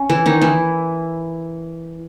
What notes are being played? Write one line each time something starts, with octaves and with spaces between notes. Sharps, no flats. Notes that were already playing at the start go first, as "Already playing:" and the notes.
Already playing: C#4
E3 E4
D#3 D#4
E3 E4